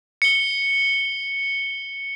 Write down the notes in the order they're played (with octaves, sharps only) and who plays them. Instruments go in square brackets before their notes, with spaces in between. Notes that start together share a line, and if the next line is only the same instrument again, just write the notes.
[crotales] C#7 G7